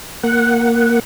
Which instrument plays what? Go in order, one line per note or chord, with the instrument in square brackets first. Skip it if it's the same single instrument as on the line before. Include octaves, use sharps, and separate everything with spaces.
[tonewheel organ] A#3 F#5